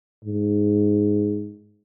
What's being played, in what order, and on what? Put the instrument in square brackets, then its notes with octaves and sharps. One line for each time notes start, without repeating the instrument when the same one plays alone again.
[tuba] G#2